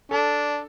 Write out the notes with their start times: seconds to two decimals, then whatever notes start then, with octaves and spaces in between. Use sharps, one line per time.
0.11 D4 A4